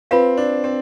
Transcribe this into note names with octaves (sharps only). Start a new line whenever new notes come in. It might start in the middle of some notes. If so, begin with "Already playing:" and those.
C4 F4 B4 F5
D4
C4